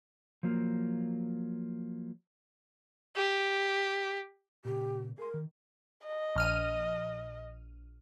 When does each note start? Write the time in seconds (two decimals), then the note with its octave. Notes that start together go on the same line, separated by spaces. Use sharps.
0.43 F3 F#3 A#3
3.17 G4
4.65 A#2 C#3 G4
5.18 G#4 A#4 C6
5.34 D#3
6.06 D#5
6.36 A#1 F6 D#7